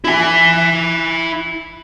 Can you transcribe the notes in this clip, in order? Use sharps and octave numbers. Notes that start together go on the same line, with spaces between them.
E4 G#5